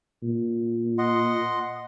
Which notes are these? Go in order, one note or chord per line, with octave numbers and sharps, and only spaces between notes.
A#2
D#5 F#5 C6